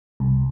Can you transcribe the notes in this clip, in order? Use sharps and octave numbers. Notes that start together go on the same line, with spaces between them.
C2